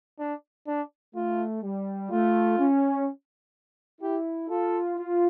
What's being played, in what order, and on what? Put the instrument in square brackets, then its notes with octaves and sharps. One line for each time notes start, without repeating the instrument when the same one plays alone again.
[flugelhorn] D4
D4
[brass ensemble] A3 [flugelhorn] F4
[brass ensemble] G3
[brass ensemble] A3 [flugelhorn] F4
[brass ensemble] C#4
[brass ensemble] E4 [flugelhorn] G4
[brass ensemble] F4 [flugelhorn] A4
[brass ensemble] F4